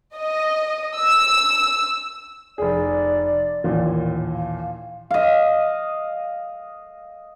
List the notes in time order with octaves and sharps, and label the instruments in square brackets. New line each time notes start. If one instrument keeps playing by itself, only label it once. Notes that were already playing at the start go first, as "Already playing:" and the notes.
[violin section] D#5
E6
[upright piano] F1 G#4 [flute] D5
[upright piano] A1 D#2 A#2
[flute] F5
[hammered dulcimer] D#5 F5